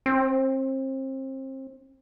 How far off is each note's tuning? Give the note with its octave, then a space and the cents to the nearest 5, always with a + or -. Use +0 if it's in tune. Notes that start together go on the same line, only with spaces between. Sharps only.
C4 +30